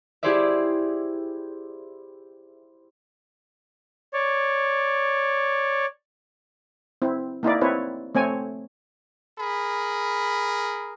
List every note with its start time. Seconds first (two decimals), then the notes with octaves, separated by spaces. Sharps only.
0.23 E4 G4 G#4 C5 D5 E5
4.14 C#5 D5
7.02 C4 E4
7.43 A#3 D#4 E4 D5
7.61 C4 E4 B4 C#5
8.15 A3 C4 C#5 G#5
9.39 G#4 A#4 B5